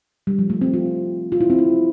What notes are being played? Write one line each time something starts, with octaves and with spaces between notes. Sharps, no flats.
G3
F3
A3
C4
F4
F4
E4
C4
E4